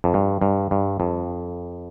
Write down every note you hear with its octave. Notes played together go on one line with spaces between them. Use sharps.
F2
G2
G2
G2
F2